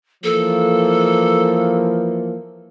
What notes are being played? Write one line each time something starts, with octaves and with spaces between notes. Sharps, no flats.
E3 F3 A#3 A4